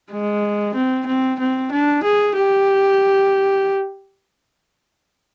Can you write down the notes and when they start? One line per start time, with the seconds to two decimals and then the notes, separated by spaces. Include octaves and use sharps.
0.11 G#3
0.75 C4
1.07 C4
1.39 C4
1.72 D4
2.04 G#4
2.36 G4